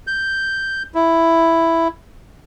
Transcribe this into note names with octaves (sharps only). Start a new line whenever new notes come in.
G6
E4